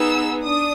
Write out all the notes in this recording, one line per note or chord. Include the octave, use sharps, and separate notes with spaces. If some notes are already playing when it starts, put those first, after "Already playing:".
Already playing: B3 D#4 G#4 E6
D4 D#6